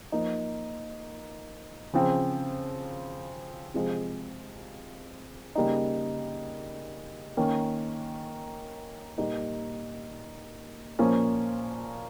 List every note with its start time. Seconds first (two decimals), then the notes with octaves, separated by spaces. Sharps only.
0.12 F3 A#3 D#4
1.93 C#3 F3 C4
3.74 C3 F3 G#3
5.55 C#3 G3 A#3 D#4
7.37 D#3 A#3 C#4
9.18 A#2 G3 A#3 D#4
10.99 A#2 F3 A#3 C#4